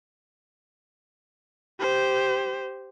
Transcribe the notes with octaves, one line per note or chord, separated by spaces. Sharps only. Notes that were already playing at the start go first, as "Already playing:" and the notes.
G4 C5